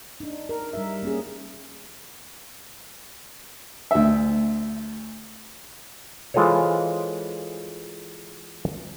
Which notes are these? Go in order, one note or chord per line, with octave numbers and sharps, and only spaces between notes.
D4 D#4
A#4
G3 A#4 E5
A#3 C#4 G#4
D2 E5
E3 G#3 F4 A4 C5 C#5